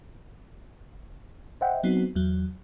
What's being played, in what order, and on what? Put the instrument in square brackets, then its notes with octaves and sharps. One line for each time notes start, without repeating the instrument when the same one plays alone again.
[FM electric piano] C5 D#5 E5 F#5 G5
F#3 B3 C4 D#4 F#4
E2 F#3